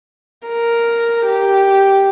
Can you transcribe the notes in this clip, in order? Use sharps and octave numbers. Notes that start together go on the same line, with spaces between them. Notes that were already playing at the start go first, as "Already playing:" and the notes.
A#4
G4